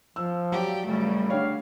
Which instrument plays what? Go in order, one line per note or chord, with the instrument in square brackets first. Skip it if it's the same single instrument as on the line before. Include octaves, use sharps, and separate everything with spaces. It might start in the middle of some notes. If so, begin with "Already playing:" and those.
[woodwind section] F3 [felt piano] E6
[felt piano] F#3 [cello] G4 D5
[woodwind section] F#2 G3 [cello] C#3 A3
[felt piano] D3 C#5 [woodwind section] G4 F5